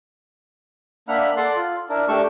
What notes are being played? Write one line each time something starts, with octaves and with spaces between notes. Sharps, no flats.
A#3 D4 E5 F#5 B5 F6
A4 D5 F#5 C6
F4
D4 E4 A#4
A3 D4 G4 C#6 E6